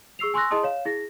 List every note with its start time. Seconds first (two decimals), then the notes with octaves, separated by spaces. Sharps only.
0.19 G#4 C#6 E6 C7 F7
0.34 G#5 C6 C#6 E6 F#6 A#6
0.50 E4 G#4 D#5 A5 C6 D#6
0.63 C#5 F5 E7
0.85 E4 G#4 A#6